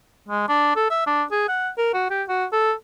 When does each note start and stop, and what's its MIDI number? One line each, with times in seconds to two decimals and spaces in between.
0.29 0.48 56
0.48 0.71 62
0.76 0.88 69
0.90 1.04 76
1.07 1.23 62
1.31 1.43 68
1.48 1.69 78
1.78 1.92 70
1.94 2.07 66
2.10 2.23 67
2.29 2.45 66
2.53 2.72 69